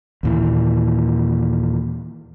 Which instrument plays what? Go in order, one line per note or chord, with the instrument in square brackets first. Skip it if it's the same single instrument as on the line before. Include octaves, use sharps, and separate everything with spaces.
[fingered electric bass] D#2 A#2 E3